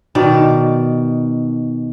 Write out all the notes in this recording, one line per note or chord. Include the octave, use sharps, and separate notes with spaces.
B2 D#3 D5